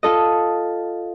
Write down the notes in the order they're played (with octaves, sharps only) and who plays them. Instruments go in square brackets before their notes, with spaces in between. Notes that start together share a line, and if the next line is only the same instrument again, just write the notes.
[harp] F4 A4 D#5